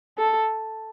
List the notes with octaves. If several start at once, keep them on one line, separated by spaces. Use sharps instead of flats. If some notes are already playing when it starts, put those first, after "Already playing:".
A4